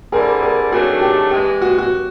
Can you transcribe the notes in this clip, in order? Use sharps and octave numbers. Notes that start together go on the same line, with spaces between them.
D3 G3 C4 E4 G#4 A#4
G#4 A#4
D#3 F#3 A3 D4 F#4 G#4
G4
G2 E3 G#3 G4
F#4
F#4